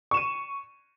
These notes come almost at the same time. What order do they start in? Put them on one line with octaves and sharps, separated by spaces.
C#6 E7 D#7